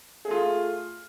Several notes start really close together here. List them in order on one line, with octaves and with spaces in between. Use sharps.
G#4 A3 F4